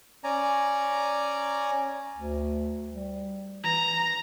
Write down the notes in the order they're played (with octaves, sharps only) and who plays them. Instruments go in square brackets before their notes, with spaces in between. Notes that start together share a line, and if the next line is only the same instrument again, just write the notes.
[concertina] C#4 D5 G#5 A#5
[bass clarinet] D2
G3
[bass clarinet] E3 [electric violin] A#5